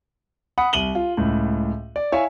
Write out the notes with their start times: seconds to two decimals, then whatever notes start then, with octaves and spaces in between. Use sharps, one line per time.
0.58 F#5 B5 D#6
0.73 C2 D#7 F#7 G7
0.95 F4
1.17 C#2 A2
1.96 D5
2.12 E4 C#5 E5 F5 G#5